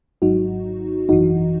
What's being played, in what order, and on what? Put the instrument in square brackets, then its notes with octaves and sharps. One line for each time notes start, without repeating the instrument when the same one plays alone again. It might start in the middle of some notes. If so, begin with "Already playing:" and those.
[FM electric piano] G#1 G#2 F#3 D#4 F#4
G#1 F#2 E3 D#4 F#4